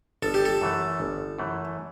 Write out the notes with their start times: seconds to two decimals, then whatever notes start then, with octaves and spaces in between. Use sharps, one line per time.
0.22 G1 A4
0.34 G4
0.46 A4
0.61 F#2 E3 A3
1.00 G1
1.39 F#2 E3 A3